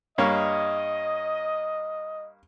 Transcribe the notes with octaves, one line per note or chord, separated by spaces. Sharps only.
G2 A#3 C#5 D#5